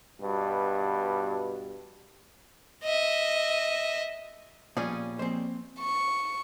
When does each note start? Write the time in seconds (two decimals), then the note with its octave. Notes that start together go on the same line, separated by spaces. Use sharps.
0.21 G2 B2
2.84 D#5 E5
4.77 A#2 F3 G3 B3 C#4 G#4
5.19 F3 A#3 C4 C5 C6
5.79 C#6